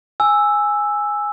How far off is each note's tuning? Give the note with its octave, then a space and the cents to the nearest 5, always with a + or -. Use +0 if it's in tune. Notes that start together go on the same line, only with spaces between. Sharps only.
G#5 +0 E6 +0